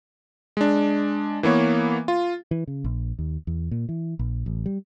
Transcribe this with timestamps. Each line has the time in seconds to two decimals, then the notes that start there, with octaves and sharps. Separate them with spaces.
0.57 G#3 D4
1.43 E3 A#3 B3 C#5
2.08 F4
2.51 E3
2.67 C#3
2.84 A#1
3.19 D#2
3.47 E2
3.71 A#2
3.89 E3
4.19 A#1
4.46 A1
4.66 G3